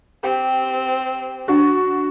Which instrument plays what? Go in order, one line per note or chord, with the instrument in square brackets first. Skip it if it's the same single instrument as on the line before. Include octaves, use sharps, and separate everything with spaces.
[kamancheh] C4 [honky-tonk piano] G4
[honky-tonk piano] D3 D4 F#4